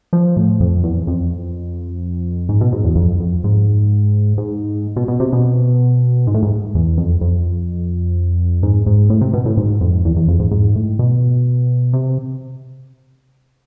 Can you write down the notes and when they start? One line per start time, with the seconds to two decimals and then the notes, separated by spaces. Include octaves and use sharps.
0.13 F3
0.36 A2
0.60 F2
0.84 E2
1.07 F2
2.49 G#2
2.61 B2
2.72 G#2
2.84 E2
2.96 F2
3.20 F2
3.44 G#2
4.38 G#2
4.96 B2
5.08 B2
5.20 C3
5.33 B2
6.27 G#2
6.34 A2
6.43 G#2
6.75 E2
6.98 F2
7.21 F2
8.63 G#2
8.86 G#2
9.10 A2
9.21 C3
9.33 B2
9.45 A2
9.57 G#2
9.81 F2
10.05 E2
10.16 E2
10.28 F2
10.40 G#2
10.51 G#2
10.76 A2
10.99 B2
11.93 C3